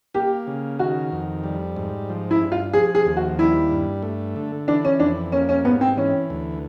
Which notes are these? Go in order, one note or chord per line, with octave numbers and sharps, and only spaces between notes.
A#3 G4
C#3
D#3 F#4
F2
G3
G#2
F3
E4
G2
F4
F3 G#4
G#4
D#2
F#4
G3 E4
G2
A3
D3
E3 D4
C#4
F2 D4
A#3 C#4
C#4
G#2 B3
C4
E3 C#4
D2